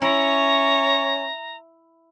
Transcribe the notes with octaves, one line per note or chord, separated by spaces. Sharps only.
C#4 E4 C#5 A#5